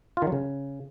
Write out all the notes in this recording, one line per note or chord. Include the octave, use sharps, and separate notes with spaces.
F4
D#3
F#3
C#3